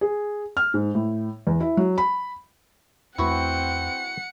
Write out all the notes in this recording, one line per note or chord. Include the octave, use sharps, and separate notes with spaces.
G#4
F6
G#2
A2
E2
E4
F#3
B5
E2 A3 C4 E4 F#4 B4 F#5 C#7